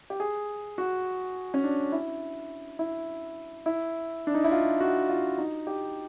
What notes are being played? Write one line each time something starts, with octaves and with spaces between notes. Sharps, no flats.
G4
G#4
F#4
C#4
D4
E4
E4
E4
D4
D#4
E4
F4
F#4
F4
D#4
G4